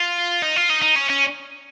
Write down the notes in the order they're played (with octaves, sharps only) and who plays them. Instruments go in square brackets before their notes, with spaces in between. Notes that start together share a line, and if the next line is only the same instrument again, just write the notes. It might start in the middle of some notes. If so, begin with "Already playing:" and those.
Already playing: [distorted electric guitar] F4
D#4
F4
D#4
D#4
C#4
C#4